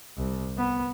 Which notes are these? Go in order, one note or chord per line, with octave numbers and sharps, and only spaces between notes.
C2
B3